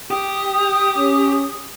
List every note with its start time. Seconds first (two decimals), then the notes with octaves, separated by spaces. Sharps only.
0.11 G4 D#6
0.97 C#4